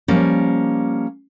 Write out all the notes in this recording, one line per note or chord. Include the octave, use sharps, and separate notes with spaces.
F3 G3 A#3 C#4